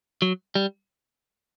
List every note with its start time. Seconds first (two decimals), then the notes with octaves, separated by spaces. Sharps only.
0.22 F#3
0.55 G3